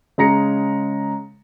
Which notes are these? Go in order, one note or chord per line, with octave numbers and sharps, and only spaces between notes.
C#3 G#3 A#5 A#6 C#7